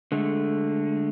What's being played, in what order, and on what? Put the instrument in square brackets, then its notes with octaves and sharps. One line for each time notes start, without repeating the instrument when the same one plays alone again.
[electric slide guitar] D3 G#3 A3